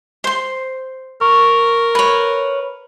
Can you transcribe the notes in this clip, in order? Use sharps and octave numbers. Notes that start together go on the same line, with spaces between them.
C5 C6
A#4 C#6
B4 C#5 B5